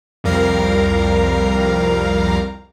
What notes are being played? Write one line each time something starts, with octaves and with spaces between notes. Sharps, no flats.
C2 F2 G3 A#4 F5 A#5